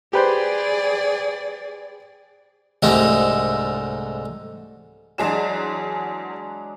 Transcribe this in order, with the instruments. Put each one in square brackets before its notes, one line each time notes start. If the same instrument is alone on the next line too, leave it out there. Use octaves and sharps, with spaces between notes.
[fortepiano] G4 B4 C5 [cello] G#4 D5
[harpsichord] C2 G#2 D3 A3 D4 D#4
[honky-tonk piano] E2 G#4 E7 [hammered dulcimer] F#3 G#3 D4